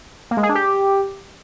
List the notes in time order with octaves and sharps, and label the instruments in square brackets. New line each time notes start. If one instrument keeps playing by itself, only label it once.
[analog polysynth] A#3
G#3
G#4
D4
G4